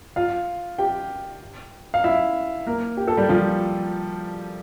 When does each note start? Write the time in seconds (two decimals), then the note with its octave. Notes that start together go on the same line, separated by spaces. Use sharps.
0.16 F4 F5
0.78 G4 G5
1.94 F5
2.04 E4 E5
2.66 A#3 A#4
2.97 G4
3.08 A4
3.17 G3 G4
3.29 F3 F4